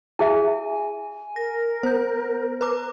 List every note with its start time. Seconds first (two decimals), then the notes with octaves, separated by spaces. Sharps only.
0.19 E4 G#4 E5 G#5
1.36 A#4 A#6
1.83 B3 C5 G6
2.61 B4 A#5 D6 F#6